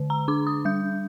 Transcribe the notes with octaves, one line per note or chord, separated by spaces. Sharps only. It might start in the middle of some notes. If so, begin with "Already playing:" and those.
Already playing: D3
A#5
D4 D6
D#6
G3 G6